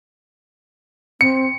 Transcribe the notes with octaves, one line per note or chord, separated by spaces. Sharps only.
C4 C#7